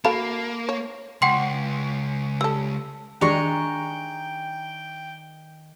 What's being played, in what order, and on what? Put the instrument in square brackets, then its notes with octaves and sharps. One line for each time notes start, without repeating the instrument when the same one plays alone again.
[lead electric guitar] A#3 [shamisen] F#4 A4 F5 [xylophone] B5
[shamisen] C#5
[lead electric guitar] C#2 [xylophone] F#5 G5 C6
[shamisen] G3 A4 [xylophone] E6
[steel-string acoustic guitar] D#3 G#5 [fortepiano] G#3 D4 [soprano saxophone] G5 [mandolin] A#5 C#6